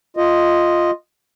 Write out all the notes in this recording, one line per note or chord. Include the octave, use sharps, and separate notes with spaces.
F4 D#5